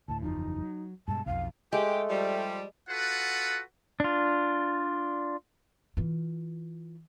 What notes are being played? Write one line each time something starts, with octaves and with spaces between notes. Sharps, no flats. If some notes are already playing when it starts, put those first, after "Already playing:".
D2 A2 A5
F#1 E2 F3 D#4
F#3
G2 B2 G#3 A5
B1 F2 F5
G#3 A3 G4
F3 G3
F4 F#4 A4 B4 F#5
D4 F4
E3 F4